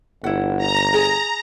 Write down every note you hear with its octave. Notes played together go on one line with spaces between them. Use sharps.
G1 E4 F#5
A#5
G#4